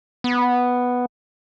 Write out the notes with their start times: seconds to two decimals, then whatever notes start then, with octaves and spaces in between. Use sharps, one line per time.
0.24 B3